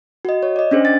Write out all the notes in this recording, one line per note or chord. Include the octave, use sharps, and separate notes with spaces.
F#4 D#5
C#5
D5 D#5
C#4 D4 G#4 C5
A6